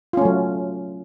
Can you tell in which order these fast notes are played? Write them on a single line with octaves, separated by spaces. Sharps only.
F4 C#4 A3 F#3